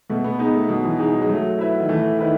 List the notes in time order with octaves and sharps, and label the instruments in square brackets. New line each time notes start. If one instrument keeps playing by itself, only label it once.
[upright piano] B2 [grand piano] A3
[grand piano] A3
B3
[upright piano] G#3 D#4 [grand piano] B3
[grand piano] A3
[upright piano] B2 [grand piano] F#3
[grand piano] E3
[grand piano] E3 [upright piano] G#3 D#4
[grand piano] F#3
G#3
[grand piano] F#3 [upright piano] A3
[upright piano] E4 B4 E5
[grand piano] D#3
[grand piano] E3 [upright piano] A3
[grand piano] D#3 [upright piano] E4 B4